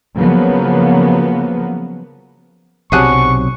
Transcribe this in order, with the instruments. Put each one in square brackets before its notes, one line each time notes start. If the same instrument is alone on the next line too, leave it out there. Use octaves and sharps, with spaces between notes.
[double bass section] C#3 F3 F#3 A#3 B3
[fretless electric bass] B1 C3 F#3 [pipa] D4 G#4 F#5 [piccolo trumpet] C#6